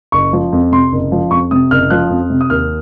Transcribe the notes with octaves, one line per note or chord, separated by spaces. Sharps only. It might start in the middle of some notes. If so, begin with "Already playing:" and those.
F#1 C#6
F3
F2
C3 C6
F#1
F3
F2 C#6
C3 D#6
F#1 F6
F3 F#6
F2
C3
D#6
D#2 F6